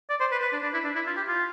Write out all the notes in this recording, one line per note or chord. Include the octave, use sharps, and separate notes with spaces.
D5
C5
B4
B4
D4
D4
E4
D4
E4
F4
G4
F4